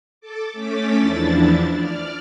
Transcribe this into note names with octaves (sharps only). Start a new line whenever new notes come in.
A4 A5 D6
A3 C#4 D6 A6 B6
E2 F3 D4 E4 A6
D5 F6